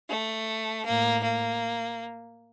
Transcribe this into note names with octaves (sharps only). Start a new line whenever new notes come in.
A3
A2 A#3
A#3